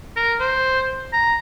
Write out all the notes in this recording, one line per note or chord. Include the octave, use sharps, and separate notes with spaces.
A#4
C5
A#5